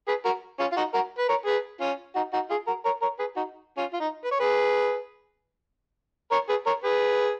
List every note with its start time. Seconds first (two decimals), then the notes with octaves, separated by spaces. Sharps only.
0.07 G#4 B4
0.25 F#4 A#4
0.59 C#4 F4
0.72 F4
0.76 D#4 F#4
0.94 F#4 A#4
1.18 B4
1.29 A#4 C#5
1.45 G#4 B4
1.80 C#4 F4
2.15 D#4 F#4
2.33 D#4 F#4
2.50 F4 G#4
2.67 F#4 A#4
2.85 A#4 C#5
3.02 A#4 C#5
3.19 G#4 B4
3.36 D#4 F#4
3.77 C#4 F4
3.93 F4
4.00 D#4
4.24 B4
4.31 C#5
4.40 G#4 B4
6.31 A#4 C#5
6.49 G#4 B4
6.66 A#4 C#5
6.84 G#4 B4